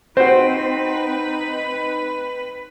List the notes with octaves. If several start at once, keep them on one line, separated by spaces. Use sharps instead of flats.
C4 D#4 F#4 B4 C5